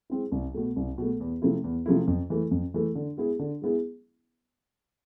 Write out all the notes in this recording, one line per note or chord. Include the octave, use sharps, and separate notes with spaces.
G#3 C4 E4
C2
B2 A3
C2
B2 A3
E2
C3 F3 A3 E4
E2
C3 F3 A3 E4
F2
E3 A3
F2
E3 A3
D3
G#3 B3 E4 G#4
D3
G#3 B3 E4 G#4